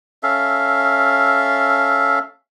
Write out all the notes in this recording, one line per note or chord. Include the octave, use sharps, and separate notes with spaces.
C#4 A4 E5 F5